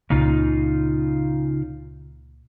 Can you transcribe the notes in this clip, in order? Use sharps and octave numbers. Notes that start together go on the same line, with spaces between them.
C#2 A#2 C#3 D#4 F4